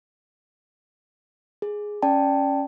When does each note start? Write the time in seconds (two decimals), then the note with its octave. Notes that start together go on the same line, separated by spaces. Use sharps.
1.62 G#4
2.02 C#4 D5 G5 A5